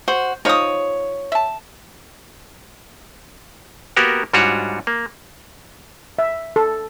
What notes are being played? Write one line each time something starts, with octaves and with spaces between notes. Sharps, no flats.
F#4 C5
F3 D#4 C#5 D#6
E5 A5
A#3 B3 F#4 G4 A#4
G#2 G3 D4 F4 F#4 C#5
A#3
E5
A4